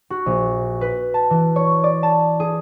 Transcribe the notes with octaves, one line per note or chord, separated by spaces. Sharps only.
F#4
A#1
B4
A5
E3
C#5
D5
A5
G#4